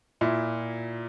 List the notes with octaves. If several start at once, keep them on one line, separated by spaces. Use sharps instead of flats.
A#2 E4